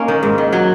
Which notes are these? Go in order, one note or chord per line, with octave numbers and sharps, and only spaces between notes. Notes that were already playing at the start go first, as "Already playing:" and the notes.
Already playing: A#3 C#4 D#4
D#3
G#2
D#3
F#3